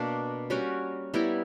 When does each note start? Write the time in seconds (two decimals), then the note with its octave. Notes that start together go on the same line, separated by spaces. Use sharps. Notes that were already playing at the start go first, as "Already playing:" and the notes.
Already playing: B2 A#3 D4 A#4
0.50 G3 C#4 F#4 A#4
1.14 G3 B3 E4 A#4